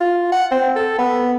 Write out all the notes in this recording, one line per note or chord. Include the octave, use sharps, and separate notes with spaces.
F4
F#5
C4
A4
B3